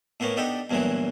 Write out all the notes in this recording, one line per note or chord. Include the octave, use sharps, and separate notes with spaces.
A2 A#3 B3 C#4
B3 D4 D#4 G4 A4
E2 G2 A#2 E3 F#3